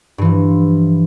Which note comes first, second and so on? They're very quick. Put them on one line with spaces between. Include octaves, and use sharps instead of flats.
G2 E3 F3